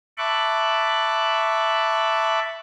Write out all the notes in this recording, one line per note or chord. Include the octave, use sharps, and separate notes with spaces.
E5 A5 B5 C#6 D6 F#6